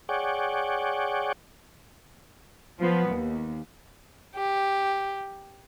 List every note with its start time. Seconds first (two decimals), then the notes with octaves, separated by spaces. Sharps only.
0.09 G#4 C#5 D5 F#5 G5
2.79 F3 B3
3.10 D#2
4.36 G4